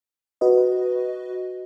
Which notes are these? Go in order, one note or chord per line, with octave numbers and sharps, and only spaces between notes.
F#4 B4 D#5